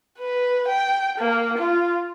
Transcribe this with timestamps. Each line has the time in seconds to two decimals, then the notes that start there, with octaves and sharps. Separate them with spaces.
0.19 B4
0.67 G5
1.18 A#3
1.58 F4